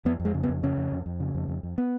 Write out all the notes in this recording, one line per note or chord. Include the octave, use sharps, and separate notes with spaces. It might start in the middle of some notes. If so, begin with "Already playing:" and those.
F2 B3
F2
G#3
C#3
B3
F2
C#3 C#4
F2
F2
F2
C#3
F2
F2
F2
B3